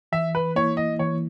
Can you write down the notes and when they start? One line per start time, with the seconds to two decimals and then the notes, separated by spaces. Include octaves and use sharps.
0.12 E3 E5
0.35 B4
0.56 A#3 E4 C#5
0.77 D#5
0.99 E3 C#5